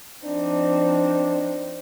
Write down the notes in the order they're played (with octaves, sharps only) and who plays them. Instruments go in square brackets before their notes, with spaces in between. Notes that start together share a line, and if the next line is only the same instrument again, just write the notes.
[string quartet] F3 C4 D#4 [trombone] D4